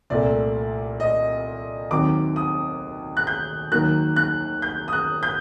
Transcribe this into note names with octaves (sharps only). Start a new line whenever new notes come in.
C2 A#2 A3 D5
D#5
D#2 D#3 F#3 C4 D6
D#6
F#6
G6
D#2 D#3 F#3 A#3 F#6
F#6
G6
D#6
F#6
G6